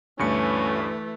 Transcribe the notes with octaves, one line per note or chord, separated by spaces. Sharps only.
D2 G2 E3 A3 C#4 C#7